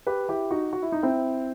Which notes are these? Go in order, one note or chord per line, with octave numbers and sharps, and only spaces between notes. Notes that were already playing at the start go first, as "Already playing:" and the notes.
G4 B4
E4 G4
D#4 F#4
F#4
E4
D#4
C4 E4